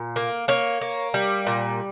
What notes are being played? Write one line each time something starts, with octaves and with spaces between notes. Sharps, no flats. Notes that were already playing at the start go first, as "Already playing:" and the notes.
Already playing: A#2
A#3
A#3 C#5
A#3
G3
A#2